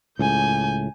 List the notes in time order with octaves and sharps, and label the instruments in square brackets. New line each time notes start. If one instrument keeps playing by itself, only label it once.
[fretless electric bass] C#2 A2 [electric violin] G#5 G6